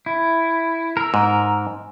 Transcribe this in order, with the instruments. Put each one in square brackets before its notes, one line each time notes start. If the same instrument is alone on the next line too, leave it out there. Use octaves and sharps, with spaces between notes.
[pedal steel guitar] E4
A#4 E6
[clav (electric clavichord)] G#2